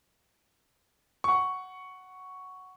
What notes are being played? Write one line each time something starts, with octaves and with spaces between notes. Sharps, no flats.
F#5 C#6